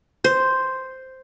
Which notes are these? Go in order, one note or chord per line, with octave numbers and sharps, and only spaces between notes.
C5